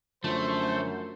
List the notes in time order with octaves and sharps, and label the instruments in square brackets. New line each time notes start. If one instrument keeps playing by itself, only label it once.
[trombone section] F#2 [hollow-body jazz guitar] D3 F3 F4 [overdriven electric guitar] A3 [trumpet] C5